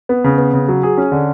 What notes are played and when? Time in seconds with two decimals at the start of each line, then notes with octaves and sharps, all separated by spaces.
0.09 B3
0.24 C#3
0.38 B3
0.53 C#3
0.68 F#3
0.83 G#4
0.98 C#4
1.12 D3